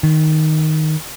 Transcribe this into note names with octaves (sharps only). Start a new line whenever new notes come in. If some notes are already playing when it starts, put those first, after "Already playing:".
D#3